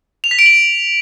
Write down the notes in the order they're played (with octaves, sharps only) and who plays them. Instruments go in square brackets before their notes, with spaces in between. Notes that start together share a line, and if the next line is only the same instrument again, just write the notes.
[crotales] F7
B6
D7
F#7